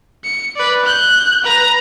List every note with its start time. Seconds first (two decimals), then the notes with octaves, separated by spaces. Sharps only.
0.24 C#7
0.56 B4 D5
0.85 F#6 G6
1.44 B4 A#5